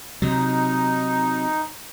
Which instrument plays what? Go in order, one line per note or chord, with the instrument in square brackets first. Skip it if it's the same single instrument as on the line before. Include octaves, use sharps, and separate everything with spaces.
[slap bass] C3 F#3 [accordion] D#4